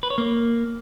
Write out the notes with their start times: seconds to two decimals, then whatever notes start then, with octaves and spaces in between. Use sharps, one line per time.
0.03 B4
0.10 C#5
0.18 A#3